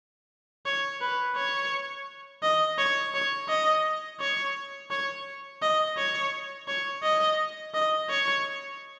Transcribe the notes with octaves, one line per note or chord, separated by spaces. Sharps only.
C#5
B4
C#5
D#5
C#5
C#5
D#5
C#5
C#5
D#5
C#5
C#5
D#5
D#5
C#5